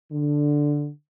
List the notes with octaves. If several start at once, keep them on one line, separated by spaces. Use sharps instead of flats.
D3